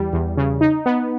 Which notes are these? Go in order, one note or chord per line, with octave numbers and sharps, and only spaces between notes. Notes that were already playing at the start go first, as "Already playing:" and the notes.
Already playing: E2 G3
E2
C#3
D#4
B3